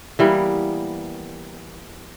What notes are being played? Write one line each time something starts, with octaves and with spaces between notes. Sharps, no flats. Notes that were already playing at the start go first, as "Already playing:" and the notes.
E3 G3 A#3 B3